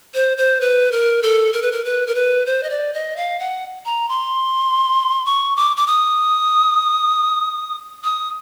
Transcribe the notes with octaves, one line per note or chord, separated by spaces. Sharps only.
C5
C5
B4
A#4
A4
A#4
B4
A#4
B4
A#4
B4
C5
D#5
D5
D#5
F5
F#5
A#5
C6
C#6
D6
D6
D#6
D#6